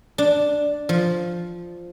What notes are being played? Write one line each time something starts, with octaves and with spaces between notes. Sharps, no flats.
D4
F3